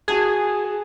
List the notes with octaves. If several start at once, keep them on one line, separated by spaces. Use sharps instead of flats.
F#4 G#4 A5 G#6